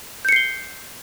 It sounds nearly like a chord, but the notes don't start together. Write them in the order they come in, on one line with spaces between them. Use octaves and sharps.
G6 C#7 C7 G7